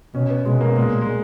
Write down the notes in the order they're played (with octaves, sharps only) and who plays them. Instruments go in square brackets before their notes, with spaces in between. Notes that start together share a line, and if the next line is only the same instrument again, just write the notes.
[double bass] B2 [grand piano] C#4
[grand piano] B3
[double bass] B2 [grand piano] G#3
[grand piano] A#3
[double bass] A#2 [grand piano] G#3
[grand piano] A#3
G#3